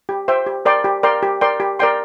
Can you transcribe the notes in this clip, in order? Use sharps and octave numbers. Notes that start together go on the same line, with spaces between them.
G4
C5 E5 G5
G4
A#4 D5 G5 C6
G4
A#4 D5 G5 C6
G4
A#4 D5 G5 C6
G4
A#4 D5 G5 C6